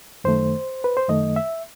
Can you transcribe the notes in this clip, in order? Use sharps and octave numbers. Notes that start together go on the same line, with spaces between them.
F#2 D#3 A3 C5
B4
C5
F#2 D#3 A3 D#5
E5